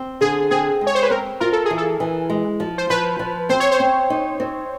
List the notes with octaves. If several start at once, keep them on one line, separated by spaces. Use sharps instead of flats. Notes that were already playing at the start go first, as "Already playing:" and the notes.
Already playing: C4
D3 G#4
C4 G#4
G#3
C#5
C5
B4
C4 A#4
F4 A#4
A4
G#4
E3
A4
E3
G#3
F3
C5
F3 B4
F3
C4 C5
C#5
C5
C4
D#4
C4